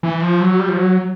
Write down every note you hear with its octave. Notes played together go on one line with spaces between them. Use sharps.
E3
F3
F#3
G3
F3
F#3